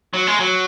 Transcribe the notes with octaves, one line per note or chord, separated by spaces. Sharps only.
F#3
G#3
F#3